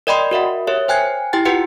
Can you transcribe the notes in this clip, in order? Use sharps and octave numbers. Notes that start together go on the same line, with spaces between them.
A#4 D5 D#5 G5 B5 C6
F#4 A#4 E5 F#5
G4 A#4 C#5 E5
C5 G5 G#5 F#6 G#6
E4 G4 G5 A6
F4 G4 B4 F#5 G5 C#7